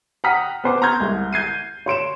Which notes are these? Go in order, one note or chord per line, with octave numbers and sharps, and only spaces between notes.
F#5 G5 A#5 D#6 F6 B6
B3 C5 D6
A#5 C6 C#6 F6 G6 G#6
C2 G#3
G6 G#6 C7 D#7
C#5 C6 D7 E7